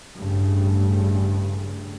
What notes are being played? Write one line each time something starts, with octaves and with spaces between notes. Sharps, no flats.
A1 G2 C#3 G3 A3